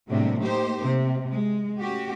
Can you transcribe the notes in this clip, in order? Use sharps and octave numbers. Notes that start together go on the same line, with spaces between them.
A2 C3 F#3 G#3 A#3 D4
A3 A#3 D#4 G4 C5
C3
G#3
A3 C#4 F#4 G4